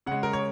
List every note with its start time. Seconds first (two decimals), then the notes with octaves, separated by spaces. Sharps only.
0.06 C#3 G#3 F#5
0.23 A#4
0.33 C#5